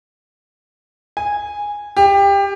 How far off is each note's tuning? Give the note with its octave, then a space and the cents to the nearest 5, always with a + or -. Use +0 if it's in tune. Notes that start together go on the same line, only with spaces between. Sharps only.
G#5 -10
G4 +20